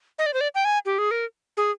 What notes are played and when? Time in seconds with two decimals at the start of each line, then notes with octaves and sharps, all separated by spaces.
0.19 D#5
0.26 D5
0.34 C5
0.41 D5
0.55 G5
0.65 G#5
0.86 G4
0.98 G#4
1.11 A#4
1.57 G#4